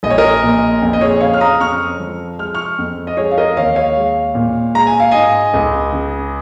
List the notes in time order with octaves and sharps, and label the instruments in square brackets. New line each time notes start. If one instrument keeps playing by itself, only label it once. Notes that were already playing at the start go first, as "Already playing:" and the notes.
[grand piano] A#1 D#5
C#5
A#4 D#5
A#2
F2
D#5
G#4 C#5
C#3 C#5 F5
F6
A#5 D#6
F2 C#6 F6
F3
G#3 F6
C#6 F6
F2
D#5
G#3 G#4 C#5
F5
A#4 D#5
D#2 C#5 F5
C#5 F5
G#3
A#2
G#3 A#5
G#5
F5
G#2 D#5 G#5
C#2
C#3